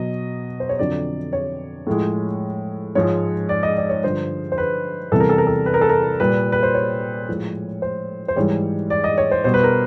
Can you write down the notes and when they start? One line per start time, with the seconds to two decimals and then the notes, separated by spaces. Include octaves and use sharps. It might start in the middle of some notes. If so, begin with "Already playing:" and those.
Already playing: B2 F#3 D#5
0.60 C5
0.69 C#5
0.79 F2 D3 F#3 D5
1.33 C#5
1.87 A2 F3 G#3
2.95 G#2 F3 G#3 C#5
3.49 D5
3.63 D#5
3.77 D5
3.89 C#5
4.03 G2 D3 F3 C5
4.52 C5
4.58 B4
5.11 E2 C3 E3 G3 A4
5.20 A#4
5.29 A4
5.38 A#4
5.47 A4
5.66 B4
5.74 A#4
5.81 A4
5.89 A#4
6.20 A#2 G3 B4
6.52 B4
6.63 C5
6.74 C#5
7.29 A2 F3 G#3
7.82 C5
8.28 C5
8.36 G#2 E3 G3 C#5
8.90 D5
9.04 D#5
9.18 C#5
9.31 C5
9.44 B2 G3 C5
9.54 B4
9.64 A#4